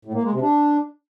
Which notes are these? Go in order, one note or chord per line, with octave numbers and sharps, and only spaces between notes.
A2
A#3
G#3
C3
D4